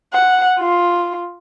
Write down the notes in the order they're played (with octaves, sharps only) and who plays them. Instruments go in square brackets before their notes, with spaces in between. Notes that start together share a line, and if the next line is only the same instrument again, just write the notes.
[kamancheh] F#5
F4